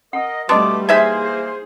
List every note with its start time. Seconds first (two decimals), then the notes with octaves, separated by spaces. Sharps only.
0.13 A#4 D#5 F#5
0.49 B2 G3 A3 B3 D4 D#5 C6 D6
0.89 E3 A#3 D#4 G#4 C5 E5 G#5